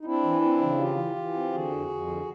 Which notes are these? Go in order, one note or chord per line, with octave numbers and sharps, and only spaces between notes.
D#4
C4 D4 E4
E3
C4
C#3
E3 F4 G4
E3
E3
C4
D3 F#4 G#4
F2
F2
D3